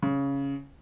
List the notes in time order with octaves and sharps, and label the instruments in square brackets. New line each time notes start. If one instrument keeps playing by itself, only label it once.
[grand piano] C#3